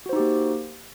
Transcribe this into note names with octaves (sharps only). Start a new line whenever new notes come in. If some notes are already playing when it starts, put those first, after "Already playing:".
A#3 D#4 F#4 G4 C5